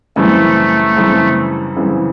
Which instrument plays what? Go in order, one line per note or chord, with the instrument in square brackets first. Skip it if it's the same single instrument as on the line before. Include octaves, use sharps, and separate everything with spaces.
[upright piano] F#2 C#3 E3 G3 C4 [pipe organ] A3
[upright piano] F#2 C#3 E3 G3 C4
F#2 C#3 E3 G3 C4